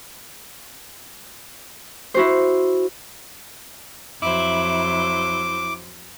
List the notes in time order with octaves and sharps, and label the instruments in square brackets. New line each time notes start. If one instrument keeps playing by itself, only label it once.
[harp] E4 F#4 C5
[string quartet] F2 F#3 C5 [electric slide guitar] E4 [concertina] D6